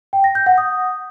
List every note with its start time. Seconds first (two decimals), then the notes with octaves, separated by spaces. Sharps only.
0.13 G5
0.24 A#6
0.35 G6
0.46 F#5
0.58 D#6